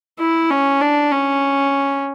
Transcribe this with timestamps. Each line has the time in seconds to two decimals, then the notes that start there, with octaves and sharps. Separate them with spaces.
0.19 E4
0.50 C#4
0.81 D4
1.12 C#4